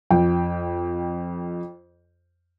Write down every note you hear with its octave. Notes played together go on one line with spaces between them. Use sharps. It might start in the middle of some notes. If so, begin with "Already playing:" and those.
F2 F4 G5